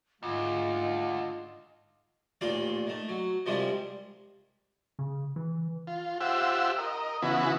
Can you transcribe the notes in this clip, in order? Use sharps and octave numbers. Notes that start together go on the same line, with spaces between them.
D2 G#2 G#3 F4 D#5
A1 D#2 A#2 F4 D5 F5
D#3 A3
F#3
C3 D#3 F3 G3 G#3 D4
C#3
E3
F4
F4 G4 C5 E5 F#5 E6
A#4 D#5
C#3 E3 B3 E4 F#4